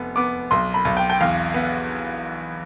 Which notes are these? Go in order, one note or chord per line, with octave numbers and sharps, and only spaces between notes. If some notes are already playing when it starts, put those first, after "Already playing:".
Already playing: F1 B3
B3 D6
B1 C6
B5
B1
G5
G5
E2 F5
B3